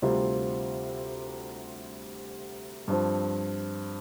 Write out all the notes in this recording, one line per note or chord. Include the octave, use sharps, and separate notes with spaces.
D2 C3 G3 C4 F4
G2 F3 C4